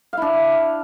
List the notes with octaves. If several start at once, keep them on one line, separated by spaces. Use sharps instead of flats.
D4 E4 F5